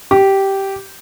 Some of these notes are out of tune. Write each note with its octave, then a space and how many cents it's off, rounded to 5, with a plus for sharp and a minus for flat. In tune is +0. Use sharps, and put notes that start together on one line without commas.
G4 -10